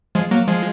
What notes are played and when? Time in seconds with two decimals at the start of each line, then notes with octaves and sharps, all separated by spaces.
0.15 F3 G#3
0.31 F#3 A#3
0.47 F3 G#3